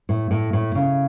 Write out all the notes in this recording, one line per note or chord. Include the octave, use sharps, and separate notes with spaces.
A2
A2
A2
C#3